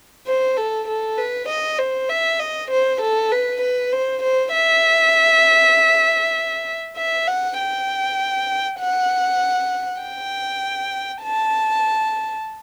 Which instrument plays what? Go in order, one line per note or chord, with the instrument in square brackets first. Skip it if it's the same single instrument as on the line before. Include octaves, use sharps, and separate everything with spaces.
[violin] C5
A4
A4
B4
D#5
C5
E5
D#5
C5
A4
B4
B4
C5
C5
E5
E5
F#5
G5
F#5
G5
A5